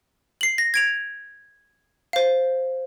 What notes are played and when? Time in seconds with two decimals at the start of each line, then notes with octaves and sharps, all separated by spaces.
0.41 C7 F#7
0.58 A#6
0.74 G#6 D7 F7
2.13 C5 F5